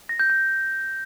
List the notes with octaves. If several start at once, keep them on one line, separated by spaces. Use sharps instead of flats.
A#6
G6
G6